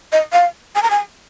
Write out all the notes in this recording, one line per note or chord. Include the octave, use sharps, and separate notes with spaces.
D#5
F5
G#5
A#5
G#5